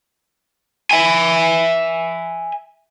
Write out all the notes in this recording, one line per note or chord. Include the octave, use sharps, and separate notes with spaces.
E5 G#5